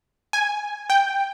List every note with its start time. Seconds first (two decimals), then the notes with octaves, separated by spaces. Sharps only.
0.33 G#5
0.90 G5